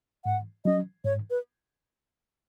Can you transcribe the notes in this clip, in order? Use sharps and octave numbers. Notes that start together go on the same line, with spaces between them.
G#2 F#5
F#3 C#4 D#5
G#2 C#5
B4